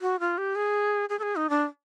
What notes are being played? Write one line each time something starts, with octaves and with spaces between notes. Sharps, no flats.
F#4
F4
G4
G#4
G#4
A4
G#4
D#4
D4